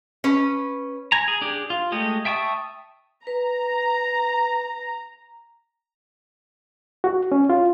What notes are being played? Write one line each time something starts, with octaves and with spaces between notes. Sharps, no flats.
C#4 B4
G#5 A#5
G#4
D4 G4 G#4
F4
G#3 A3 G4 D#5
E5 G5 A5 C#6 D#6
B4 A#5
F#4
C#4
F4